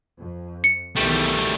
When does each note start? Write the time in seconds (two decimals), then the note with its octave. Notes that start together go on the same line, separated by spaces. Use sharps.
0.18 F2
0.64 C#7
0.96 B1 E2 D#3 G3 A3